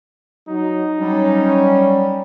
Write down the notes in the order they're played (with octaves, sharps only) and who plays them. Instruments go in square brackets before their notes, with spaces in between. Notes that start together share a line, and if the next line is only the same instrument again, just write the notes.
[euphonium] F#3 [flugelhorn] D#4
[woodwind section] F#3 G3 [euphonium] C#4